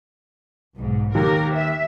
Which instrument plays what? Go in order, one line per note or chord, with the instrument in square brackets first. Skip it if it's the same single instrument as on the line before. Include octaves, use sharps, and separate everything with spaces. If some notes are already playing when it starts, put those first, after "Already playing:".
[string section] B1 G#2
[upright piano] D#2 [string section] G4 A#4
[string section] E5